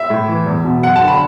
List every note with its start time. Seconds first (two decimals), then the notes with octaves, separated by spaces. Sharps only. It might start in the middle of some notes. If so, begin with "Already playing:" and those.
Already playing: E5
0.10 A2
0.28 E3
0.46 E2
0.64 B2
0.83 F#2 F#5
0.96 A5
1.01 D3
1.08 B5